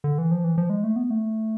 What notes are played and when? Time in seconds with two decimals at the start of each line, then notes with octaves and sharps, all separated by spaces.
0.04 D3
0.18 E3
0.31 F3
0.44 E3
0.58 F3
0.70 G#3
0.84 A3
0.96 B3
1.10 A3